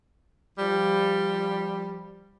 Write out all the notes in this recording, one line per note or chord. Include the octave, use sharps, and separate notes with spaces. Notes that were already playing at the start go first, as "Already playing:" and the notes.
F3 G3